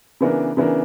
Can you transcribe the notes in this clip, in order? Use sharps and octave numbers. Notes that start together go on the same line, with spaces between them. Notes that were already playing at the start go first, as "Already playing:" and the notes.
C#3 E3 B3 D4 A#4
C#3 E3 B3 D4 A#4